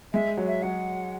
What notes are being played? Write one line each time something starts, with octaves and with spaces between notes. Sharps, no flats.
G#3 E5
F#3
E5
F#3 F#5